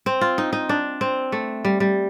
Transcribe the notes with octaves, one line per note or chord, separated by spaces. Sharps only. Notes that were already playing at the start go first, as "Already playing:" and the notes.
C4
F4
D#4
D#4
D4
C4
A3
G3
G3